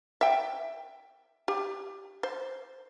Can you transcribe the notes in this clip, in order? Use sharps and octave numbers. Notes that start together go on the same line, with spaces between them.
E5 G5
G4
C5